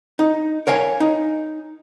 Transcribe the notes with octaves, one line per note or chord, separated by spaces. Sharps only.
D#4
A#4 C#5 F5 G#5
D#4